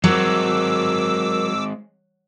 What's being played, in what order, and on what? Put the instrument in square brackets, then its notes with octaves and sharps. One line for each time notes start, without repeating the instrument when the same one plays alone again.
[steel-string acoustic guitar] F#3 [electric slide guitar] G#3 C4 [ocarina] A#4 [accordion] D6 E6